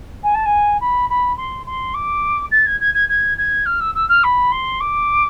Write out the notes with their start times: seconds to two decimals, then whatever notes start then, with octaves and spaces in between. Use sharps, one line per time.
0.23 G#5
0.35 A5
0.46 G#5
0.81 B5
1.10 B5
1.37 C6
1.66 C6
1.94 D6
2.51 A6
2.66 G#6
2.81 G#6
2.94 G#6
3.09 G#6
3.38 G#6
3.66 F6
3.80 E6
3.95 E6
4.09 F6
4.24 B5
4.52 C6
4.81 D6